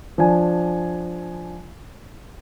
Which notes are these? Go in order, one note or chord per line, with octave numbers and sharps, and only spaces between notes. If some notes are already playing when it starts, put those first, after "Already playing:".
F3 D4 G#5